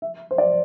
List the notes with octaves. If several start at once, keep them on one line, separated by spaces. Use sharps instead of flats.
E5
C5
D5